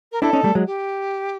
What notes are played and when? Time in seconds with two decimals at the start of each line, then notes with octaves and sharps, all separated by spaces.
0.12 A#4
0.22 D4 E4 A4
0.33 C#4 D#4
0.44 G3 A3
0.55 F#3 G#3
0.66 G4